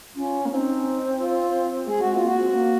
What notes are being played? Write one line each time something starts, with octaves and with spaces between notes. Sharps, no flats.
C#4 F4
A#3
C4 D#4
F4
G#3 G#4
G#3 F#4
C4 F4
A#3 F#4
C4
C4
A#3